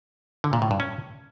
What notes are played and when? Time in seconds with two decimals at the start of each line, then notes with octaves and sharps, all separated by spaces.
0.44 D3
0.53 A#2
0.62 A2
0.71 G2
0.80 C#4